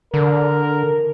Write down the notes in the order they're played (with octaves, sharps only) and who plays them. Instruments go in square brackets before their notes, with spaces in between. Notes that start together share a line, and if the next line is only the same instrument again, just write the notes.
[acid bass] D3 [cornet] A#4